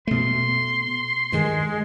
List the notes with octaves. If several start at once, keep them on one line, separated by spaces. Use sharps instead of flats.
B2 A3 C6
G2 D#3 G#3